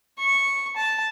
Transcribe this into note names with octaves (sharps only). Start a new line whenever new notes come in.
C#6
A5